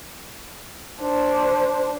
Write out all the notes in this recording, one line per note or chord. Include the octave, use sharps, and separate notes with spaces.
D4 C5